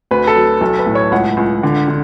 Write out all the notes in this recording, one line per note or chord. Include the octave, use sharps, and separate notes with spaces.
D2 B4
A4
F#3
B1 A4
B4
A2
C#5
C#2 F#5
C#2
D3
D3